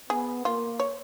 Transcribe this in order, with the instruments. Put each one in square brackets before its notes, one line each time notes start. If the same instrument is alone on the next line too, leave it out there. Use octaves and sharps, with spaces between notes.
[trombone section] B3 [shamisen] G#4
[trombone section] A#3 [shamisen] F4
[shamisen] C#5